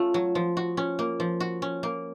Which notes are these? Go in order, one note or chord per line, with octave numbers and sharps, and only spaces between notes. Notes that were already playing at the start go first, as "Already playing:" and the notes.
Already playing: A3 C#4 F4
F#3
F3
F#4
C#4
A#3
F3
F#4
C#4
A#3